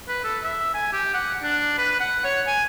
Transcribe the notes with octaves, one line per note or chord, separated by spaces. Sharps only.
B4
A4
E5
G#5
G4
F#5
D4
B4
F#5
C#5
G#5